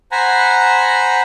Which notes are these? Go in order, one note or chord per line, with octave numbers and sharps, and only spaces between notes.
C5 F#5 G#5 A#5 B5